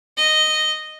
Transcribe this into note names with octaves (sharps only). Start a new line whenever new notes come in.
D#5